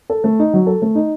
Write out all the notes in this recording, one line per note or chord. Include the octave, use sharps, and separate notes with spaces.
A4
A3
D#4
F#3
A4
A3
D#4